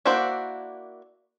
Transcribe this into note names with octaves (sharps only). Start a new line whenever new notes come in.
A#3 D4 E4 F#4 C5